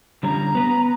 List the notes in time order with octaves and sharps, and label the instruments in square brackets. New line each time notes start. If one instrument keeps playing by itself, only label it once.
[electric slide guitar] D3 G3 C#4 [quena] A#5
[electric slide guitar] B3 B4